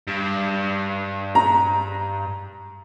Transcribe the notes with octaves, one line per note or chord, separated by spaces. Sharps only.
G2
A#5